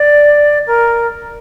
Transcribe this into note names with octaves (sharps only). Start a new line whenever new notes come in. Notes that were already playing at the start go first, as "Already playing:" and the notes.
Already playing: D5
A#4